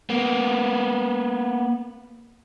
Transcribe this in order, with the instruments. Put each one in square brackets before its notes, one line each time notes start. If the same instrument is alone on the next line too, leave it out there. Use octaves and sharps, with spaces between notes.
[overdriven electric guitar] A#3 B3